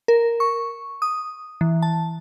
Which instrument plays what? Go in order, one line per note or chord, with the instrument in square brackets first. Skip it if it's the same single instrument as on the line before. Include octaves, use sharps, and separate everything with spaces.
[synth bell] A#4
C#6
D#6
E3
A5